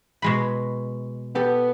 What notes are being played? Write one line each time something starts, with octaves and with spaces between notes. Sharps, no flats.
B2 G#3 B5
B3 G4 A4